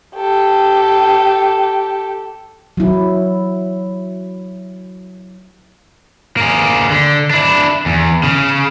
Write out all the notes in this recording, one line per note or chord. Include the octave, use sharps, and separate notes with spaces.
G4 A4
F#3 E4
A#3 G#4
D3
D4 E4
E2
C#3